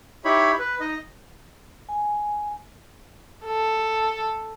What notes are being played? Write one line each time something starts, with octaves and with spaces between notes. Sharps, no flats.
D#4 E4 G4 C#5 B5
B4
D#4 D#5
G#5
A4